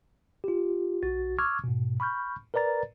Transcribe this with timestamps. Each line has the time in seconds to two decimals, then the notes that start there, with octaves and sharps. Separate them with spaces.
0.44 F4 G4
1.03 B1 F#4 A6
1.39 C#6 D6 E6 F6 G#6
1.64 G#2 B2
2.00 B5 C#6 F6 G6
2.54 A#4 B4 D5 A#5 A6